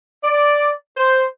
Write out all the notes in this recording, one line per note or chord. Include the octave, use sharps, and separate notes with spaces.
D5
C5